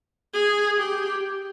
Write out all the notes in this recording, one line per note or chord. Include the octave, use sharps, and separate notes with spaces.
G#4
G4